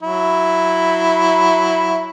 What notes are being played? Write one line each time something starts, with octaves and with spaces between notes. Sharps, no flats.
F#3 E4